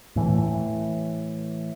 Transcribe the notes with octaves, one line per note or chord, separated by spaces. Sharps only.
A2 E3